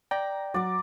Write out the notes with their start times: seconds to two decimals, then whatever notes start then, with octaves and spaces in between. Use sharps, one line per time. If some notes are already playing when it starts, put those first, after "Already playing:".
0.11 D5 G5 A#5
0.54 F#3 D5 F#5 D6